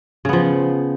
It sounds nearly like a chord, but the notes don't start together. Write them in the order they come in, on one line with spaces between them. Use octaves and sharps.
C#3 B3 F3